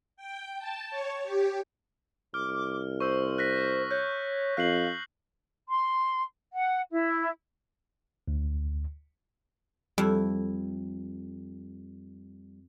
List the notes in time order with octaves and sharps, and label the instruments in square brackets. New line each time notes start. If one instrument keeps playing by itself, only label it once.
[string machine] G5
A5
C#5
G4
[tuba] C2 [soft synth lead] D6 [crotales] F6
[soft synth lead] C5 [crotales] C#6 E6
[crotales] F#6 A#6 B6
[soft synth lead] C#5 [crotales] F#6 G6
[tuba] F2 [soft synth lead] F5 [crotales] F#6 C7 F#7
[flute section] C6
F#5
E4
[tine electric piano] D2
[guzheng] F2 E4 [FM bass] G3